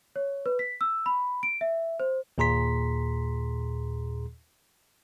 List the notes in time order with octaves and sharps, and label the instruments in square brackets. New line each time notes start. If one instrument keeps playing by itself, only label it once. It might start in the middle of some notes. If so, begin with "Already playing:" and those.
[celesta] C#5
B4
B6
E6
B5
D7
E5
C5
[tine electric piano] D#2 A#2 G#4 A#5 C6 B6